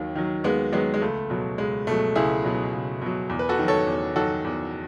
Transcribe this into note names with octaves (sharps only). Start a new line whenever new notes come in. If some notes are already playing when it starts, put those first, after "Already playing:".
Already playing: D#2 D#3 F#3
D#3 F#3
D#2 G#3 B3
D#3 F#3 G#3 B3
G#3
C#2 A3
B2 F#3
C#2 G#3
B2 F#3 A3
C#2 E4 G#4
B2 F#3
C#2
B2 F#3
E2
B4
F#4 A4
D#3 F#3
A4 C#5
E2
D#3 F#3 F#4 A4
E2